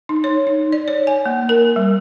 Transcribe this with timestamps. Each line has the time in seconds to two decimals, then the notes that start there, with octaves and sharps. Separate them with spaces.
0.09 D#4
0.24 C#5
0.47 D#4
0.72 D5
0.88 C#5
1.07 G#5
1.26 A#3
1.49 A#4
1.76 G3